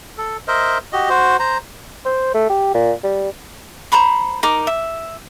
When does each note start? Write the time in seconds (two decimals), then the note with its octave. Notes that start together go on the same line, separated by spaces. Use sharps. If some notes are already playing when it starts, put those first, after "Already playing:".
0.18 A4
0.48 A#4 C5 D#5 E5
0.93 F#4 G4 D#5
1.09 F#4 C5
1.39 C5 A#5
2.06 C5
2.34 A3
2.49 G4
2.74 A#2
3.04 G3
3.92 C5 A#5 B5 C#6
4.43 D#4 A#4 D6
4.67 E5